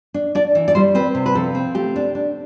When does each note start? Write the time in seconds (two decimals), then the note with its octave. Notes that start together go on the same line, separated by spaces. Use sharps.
0.14 D4
0.35 D4 D5
0.55 E3
0.68 D5
0.75 G3 C5
0.95 C4 B4
1.15 C3
1.26 B4
1.35 F3 A4
1.55 C4
1.75 A3 G4
1.96 D4
2.15 D4